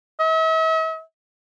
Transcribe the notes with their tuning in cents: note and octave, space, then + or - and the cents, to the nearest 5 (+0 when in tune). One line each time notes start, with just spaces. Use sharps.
E5 -45